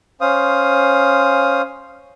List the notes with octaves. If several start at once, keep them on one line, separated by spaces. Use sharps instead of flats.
C#4 C5 F5 D#6